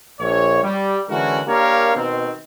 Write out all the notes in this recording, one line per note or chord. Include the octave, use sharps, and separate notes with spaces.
A#1 C#5
G3
D3 E3 G#3 C#4 F#4 A#4
A#3 D4 G4 A#4 C#5 F5
B2 D#3 B3 C4